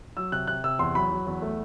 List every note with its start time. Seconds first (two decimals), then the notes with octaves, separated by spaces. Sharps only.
0.17 F#3 E6
0.32 C3 F#6
0.47 C3 F#6
0.64 C3 E6
0.79 E2 C6
0.95 F#3 B5
1.11 F#3
1.26 E2
1.42 A3